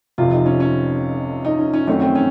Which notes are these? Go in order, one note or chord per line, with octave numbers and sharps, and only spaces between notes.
F1 F2 C3 F4
D#4
C#4
C#4
D#4
C#4
C#4
F#2 D#3 A3 C4 C#4
C4
C#4